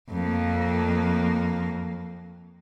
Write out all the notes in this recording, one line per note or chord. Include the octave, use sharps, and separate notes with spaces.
F2 A#3